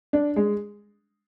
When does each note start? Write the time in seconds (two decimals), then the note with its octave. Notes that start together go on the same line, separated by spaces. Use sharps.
0.13 D4
0.36 G#3